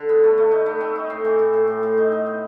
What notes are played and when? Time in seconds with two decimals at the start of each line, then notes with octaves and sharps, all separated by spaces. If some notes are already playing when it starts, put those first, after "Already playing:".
Already playing: D3
0.09 B3
0.24 A3
0.38 A3
0.52 D#4
0.66 A3
0.81 C4
0.96 D#4
1.10 A2
1.25 E3
1.39 A2
1.53 A2
1.67 A2
1.83 A2
1.98 D#4
2.12 D#4
2.26 B3